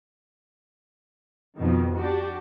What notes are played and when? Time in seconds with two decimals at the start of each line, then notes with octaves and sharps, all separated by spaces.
1.56 F2 B2 D#3
1.96 D4 F#4 G4